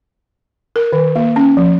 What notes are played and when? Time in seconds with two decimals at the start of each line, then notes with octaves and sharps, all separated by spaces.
0.76 A#4
0.92 D#3
1.16 A#3
1.36 C#4
1.57 F3